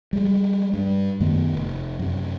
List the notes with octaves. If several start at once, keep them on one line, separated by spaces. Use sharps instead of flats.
G3 G#3
G2
F#2 D#3 A3 B3
F1
F#2 C3